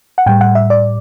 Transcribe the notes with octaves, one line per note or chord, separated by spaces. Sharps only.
F#5
A2 G3 G5
F#5
E5
D5